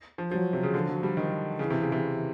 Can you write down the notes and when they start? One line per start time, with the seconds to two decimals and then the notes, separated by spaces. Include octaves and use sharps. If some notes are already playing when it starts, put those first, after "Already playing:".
0.18 F3
0.31 F3 F#3
0.53 C3
0.63 C#3
0.74 D3 F3
0.89 F#3
1.03 G3
1.17 D#3
1.59 C#3 E3
1.70 C3
1.81 C#3
1.92 C3